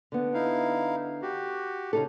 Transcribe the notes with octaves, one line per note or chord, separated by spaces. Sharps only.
D3 B3
D#4 E4 F5
F#4 G4
C#3 D#4 A4